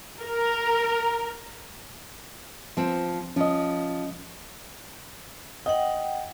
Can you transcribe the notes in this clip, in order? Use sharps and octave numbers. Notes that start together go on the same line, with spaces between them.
A#4
F3 C4
F3 C#4 D#5
D#5 F#5 G5